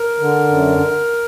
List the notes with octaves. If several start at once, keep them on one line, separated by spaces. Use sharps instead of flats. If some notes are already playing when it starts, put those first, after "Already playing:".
Already playing: A#4
D3
F#2